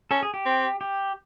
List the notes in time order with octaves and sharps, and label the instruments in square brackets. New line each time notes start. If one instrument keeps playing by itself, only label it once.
[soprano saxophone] C#4 [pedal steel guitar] A4
[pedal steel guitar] G#4
G4
[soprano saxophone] C4
[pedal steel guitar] G4